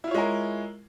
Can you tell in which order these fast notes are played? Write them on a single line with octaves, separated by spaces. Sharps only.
E4 F4 C#5 G#3 A#4